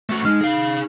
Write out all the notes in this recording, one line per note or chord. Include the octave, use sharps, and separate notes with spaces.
A3 F#4
G#3 D#4 F6
G#4 F5